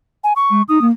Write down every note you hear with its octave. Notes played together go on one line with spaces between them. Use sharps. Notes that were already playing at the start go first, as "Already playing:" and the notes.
G#5
C#6
G#3
D#4 D#6
A#3